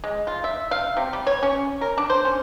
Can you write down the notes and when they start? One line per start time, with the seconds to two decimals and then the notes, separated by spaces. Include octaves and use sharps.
0.04 G#3
0.27 F4
0.44 E5
0.71 F5
0.97 C3
1.13 G3
1.27 C#5
1.43 C#4
1.81 A#4
1.98 D4
2.10 C5
2.25 C#4